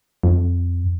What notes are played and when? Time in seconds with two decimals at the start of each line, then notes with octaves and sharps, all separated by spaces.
0.23 F2